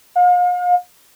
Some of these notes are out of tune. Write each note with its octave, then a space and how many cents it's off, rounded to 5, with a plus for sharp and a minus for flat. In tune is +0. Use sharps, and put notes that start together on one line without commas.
F5 +40